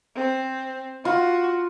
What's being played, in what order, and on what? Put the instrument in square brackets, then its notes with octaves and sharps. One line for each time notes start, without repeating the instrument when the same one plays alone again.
[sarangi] C4
[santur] F4 [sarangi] F#4